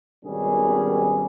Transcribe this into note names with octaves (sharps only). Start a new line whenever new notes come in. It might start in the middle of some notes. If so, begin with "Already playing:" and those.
G#1 B2 D#3 G3 C#4 G#4